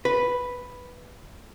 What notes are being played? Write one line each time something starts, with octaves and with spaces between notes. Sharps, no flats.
B4